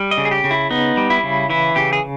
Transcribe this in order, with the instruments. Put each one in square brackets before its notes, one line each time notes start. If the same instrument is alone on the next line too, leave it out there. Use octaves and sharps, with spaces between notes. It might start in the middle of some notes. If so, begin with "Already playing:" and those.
Already playing: [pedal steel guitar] G3
D#5
C#3
G#4
G4
C#3
E4
B3 D#4
G3
E4
C#3
E3 E4
C#3 G4
G#4